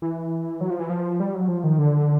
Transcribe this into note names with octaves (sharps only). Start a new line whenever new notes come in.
E3
F#3
F3
E3
F3
G3
F#3
F3
D#3
D3